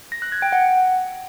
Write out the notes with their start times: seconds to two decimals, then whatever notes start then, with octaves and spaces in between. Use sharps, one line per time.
0.12 A#6
0.22 F#6
0.32 G#6
0.42 G5
0.52 F#5